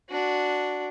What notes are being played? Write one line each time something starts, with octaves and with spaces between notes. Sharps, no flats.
D4 F#4